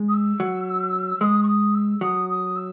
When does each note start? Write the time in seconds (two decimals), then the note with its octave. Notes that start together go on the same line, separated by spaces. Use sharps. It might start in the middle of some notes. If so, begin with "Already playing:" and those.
Already playing: G#3
0.08 D#6
0.14 E6
0.40 F#3
1.20 G#3 D#6
1.43 C#6
1.47 D#6
1.74 E6
2.01 F#3 D#6
2.29 D#6
2.56 E6